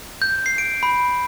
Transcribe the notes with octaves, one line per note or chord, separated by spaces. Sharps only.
G6
C7
D7
B5